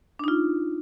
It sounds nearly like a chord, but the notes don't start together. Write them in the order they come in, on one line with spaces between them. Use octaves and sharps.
D4 D#4 F4